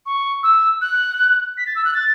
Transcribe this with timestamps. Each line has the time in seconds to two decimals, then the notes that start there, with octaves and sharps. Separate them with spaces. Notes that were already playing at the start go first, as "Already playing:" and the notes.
0.06 C#6
0.43 E6
0.81 F#6
1.57 B6
1.66 A6
1.75 E6
1.85 F#6
1.94 A6